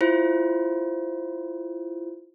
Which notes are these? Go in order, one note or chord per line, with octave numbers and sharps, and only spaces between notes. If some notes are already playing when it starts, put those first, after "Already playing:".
E4 F4 C5